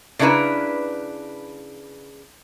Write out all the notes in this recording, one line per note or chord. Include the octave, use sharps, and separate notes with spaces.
C#3 D4 E4 A#4 B4